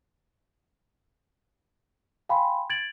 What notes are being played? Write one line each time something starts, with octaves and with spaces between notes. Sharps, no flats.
F5 G5 G#5 B5 C6
G#6 A6 D7 F#7